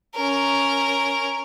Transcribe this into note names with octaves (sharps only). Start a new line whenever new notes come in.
C#4 A#4